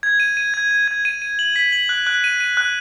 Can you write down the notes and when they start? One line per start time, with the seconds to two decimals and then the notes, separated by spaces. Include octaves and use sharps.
0.03 G#6
0.20 D#7
0.37 D#7
0.54 G#6
0.71 G#6
0.88 G#6
1.05 D#7
1.22 D#7
1.39 F#7
1.56 B6
1.72 F#7
1.89 F#6
2.07 F#6
2.24 D#7
2.40 D#7
2.57 F#6